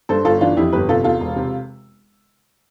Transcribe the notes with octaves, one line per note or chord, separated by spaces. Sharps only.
G2 A4 C5
G1 F4 A4
E3 D4 F4
F2 E4 G4
G1 G4 B4
C3 F4 A4
E2 F4 A4
E1
C3